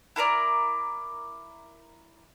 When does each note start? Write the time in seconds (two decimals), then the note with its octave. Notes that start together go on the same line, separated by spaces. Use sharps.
0.16 E4 A4 A#4 D5